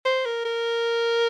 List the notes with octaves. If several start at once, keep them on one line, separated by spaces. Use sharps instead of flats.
C5
A#4
A#4